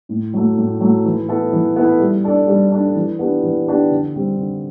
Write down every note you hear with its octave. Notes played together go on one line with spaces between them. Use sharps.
A2
F#3 A3
A2
F#3 A3
E3
B3 E4 A4
E3
B3 E4 A4
G3
D4 A4 D5
G3
D4 A4 D5
E3
B3 D4 G4
E3
B3 D4 G4
D3
G3 C4
D3